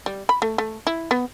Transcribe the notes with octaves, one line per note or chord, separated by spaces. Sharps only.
G3
B5
A3
A3
E4
B3